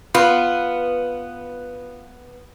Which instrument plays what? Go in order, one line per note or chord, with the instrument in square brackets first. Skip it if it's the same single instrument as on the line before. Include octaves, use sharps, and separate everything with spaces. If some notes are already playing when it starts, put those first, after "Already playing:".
[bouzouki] B3 [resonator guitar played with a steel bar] F4